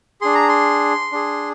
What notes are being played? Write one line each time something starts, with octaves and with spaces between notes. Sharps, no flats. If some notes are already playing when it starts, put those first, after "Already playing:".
D4 G#4 C6
A#5
C6
D4 G#4